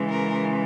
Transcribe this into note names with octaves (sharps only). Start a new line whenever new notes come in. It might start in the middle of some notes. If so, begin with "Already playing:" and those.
Already playing: C#3 E3 G#3
A#4